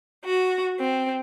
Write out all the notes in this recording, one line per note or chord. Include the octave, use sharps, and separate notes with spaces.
F#4
C4